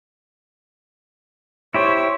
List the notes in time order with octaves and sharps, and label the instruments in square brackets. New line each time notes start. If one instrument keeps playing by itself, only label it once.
[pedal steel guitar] E4 G4 C5 [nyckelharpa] C#5